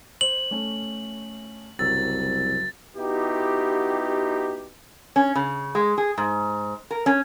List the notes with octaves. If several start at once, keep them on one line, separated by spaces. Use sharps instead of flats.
C5 F#7
A3 C#4
F#1 C2 F#3 E6 A6
B3 D#4 E4 F#4 G4
C#4
C#3
G#3
G#4
G#2
A#4
C#4